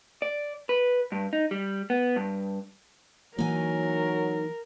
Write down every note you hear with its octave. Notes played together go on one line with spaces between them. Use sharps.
D5
B4
G2
D#4
G3
B3
G2
E3 F#3 A#3 D#4 A#4 G#5